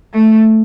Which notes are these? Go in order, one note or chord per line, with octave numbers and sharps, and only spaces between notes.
A3